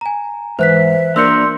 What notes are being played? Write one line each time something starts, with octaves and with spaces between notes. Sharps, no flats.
G#5 A#5
G#2 E3 B4 C5 E5 F#6 B6
A#3 D4 A#4 D5 C6 E6 G6 C#7